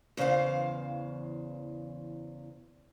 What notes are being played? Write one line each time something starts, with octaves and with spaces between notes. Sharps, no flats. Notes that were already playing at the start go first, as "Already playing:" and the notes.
E2 C#3 E3 C5 F5